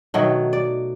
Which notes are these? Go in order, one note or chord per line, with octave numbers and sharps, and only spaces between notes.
B2 D#3 F#3 A3
D5